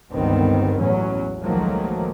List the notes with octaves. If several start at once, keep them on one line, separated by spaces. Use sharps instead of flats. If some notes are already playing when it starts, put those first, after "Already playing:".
G1 C#2 G2 D#3 B3 C4
A1 E2 F#3 C#4
C#2 D#3 F3 F#3 A3 A#3